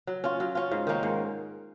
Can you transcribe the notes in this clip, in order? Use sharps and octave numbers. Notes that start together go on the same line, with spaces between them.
F#3
C#4 F4
F#3
C#4 F4
G#2
D#3 A#3 C#4
G#2